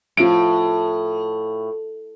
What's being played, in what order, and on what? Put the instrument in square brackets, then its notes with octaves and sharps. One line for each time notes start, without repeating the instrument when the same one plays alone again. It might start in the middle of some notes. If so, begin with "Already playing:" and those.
[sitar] A2 [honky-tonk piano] F3 D7